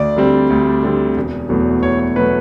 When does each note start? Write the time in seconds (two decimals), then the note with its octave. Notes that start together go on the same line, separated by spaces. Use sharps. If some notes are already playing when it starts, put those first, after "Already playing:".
Already playing: D2 D5
0.16 D3 G3 C4
0.50 D2
0.83 D3 G3 C4
1.16 E1
1.49 E2 B2 F#3 A3
1.82 E1 C#5
1.99 C#5
2.16 B2 F#3 A3 B4